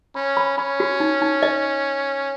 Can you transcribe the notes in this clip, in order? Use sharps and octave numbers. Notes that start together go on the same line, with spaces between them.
C#4 B5
B5
C#4 B5
F#4
D#4
D#4
D#5